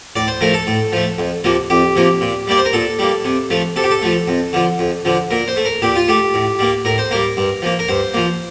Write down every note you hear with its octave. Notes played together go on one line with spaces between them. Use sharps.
A2 D5
C5
F3 A3 A#4
A4
A2
F3 A3
F2
C3 F3 A#3
F2 G4
C3 F3 A#3
A#2
G3 A#3 D5
C5
A#4
A#2 A4
G3 A#3
C3
F3 A3
C3 A4
G4
A4
F3 A3
F2
D3 F3
F2
D3 F3
A#2 A#4
C5
A3
A#4
A#2 G4
F4
A3 G4
A2
G3 A#3
A2 A#4
C5
G3 A#3 A#4
G2
F3 A#3
A#4
G2 C5
F3 A#3